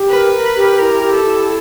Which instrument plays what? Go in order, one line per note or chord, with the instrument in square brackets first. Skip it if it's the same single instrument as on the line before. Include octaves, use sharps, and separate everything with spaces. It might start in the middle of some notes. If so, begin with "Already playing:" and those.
Already playing: [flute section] G4
[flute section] A#4 [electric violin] B4
[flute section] A#4
G4
[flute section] E4 [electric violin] A#4
[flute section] G4
[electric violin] A4
[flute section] E4